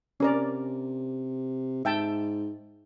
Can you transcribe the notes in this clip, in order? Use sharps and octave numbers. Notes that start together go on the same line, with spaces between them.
C3 C#4 A#4 D5
G#2 E5 G5 A5